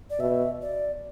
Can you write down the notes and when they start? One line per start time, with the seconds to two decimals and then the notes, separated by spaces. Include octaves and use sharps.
0.10 D5
0.19 B2 E5
0.62 D5